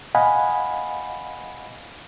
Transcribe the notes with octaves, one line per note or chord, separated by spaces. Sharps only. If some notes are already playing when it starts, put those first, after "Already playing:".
D#5 F5 F#5 G#5 B5